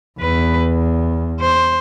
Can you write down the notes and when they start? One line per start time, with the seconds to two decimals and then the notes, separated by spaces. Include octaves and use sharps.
0.20 E2 B4
1.40 C5